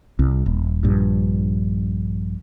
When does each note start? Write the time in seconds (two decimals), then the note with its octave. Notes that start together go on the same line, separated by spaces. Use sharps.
0.19 C2
0.46 D#1
0.83 A#1 G2